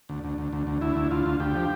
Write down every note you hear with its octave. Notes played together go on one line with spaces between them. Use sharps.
D2
D2
D2
D2
D2
D2 E4
D2
D2 F4
D2
D2 G4
F3